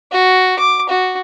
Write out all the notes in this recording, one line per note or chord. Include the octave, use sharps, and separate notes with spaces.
F#4
D6
F#4